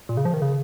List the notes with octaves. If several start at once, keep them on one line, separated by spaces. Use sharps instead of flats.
A#2
C#3
F3
D#3
C#3